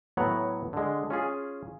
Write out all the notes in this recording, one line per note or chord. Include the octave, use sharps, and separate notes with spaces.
A2 F#3 B3 C#5 F#5 A#5
D3 G#3
C#4 F4 G#4